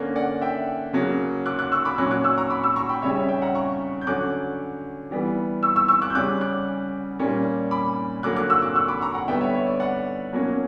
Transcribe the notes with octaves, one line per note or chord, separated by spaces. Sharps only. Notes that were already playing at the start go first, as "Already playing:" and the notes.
Already playing: D3 A#3 C#4
D5 F#5
E5 G5
C#3 F#3 A#3
D6 F#6
D6 F#6
C#6 E6
B5 D6
A#2 F#3 C#4 D6 F#6
D6 F#6
C#6 E6
A#5 C#6
B5 D6
C#6 E6
A#5 C#6
G5 B5
C#3 G3 C#4 C#5 E5
C#5 E5
E5 G5
F#5 A#5
A#5 C#6
G6
D3 F#3 C#4 D6 F#6
E3 G3 B3
C#6 E6
C#6 E6
C#6 E6
D6 F#6
G6
C#3 G3 C#4 D6 F#6
D6 F#6
A#2 G3 A#3 C#4
B5 D6
D3 F#3 A#3 D6 F#6
D6 F#6
C#6 E6
D6 F#6
C#6 E6
B5 D6
A#5 C#6
F#5 A#5
D3 G3 B3 E5 G5
C#5 E5
C#5
D5
D5 F#5
B2 F#3 A#3 C#4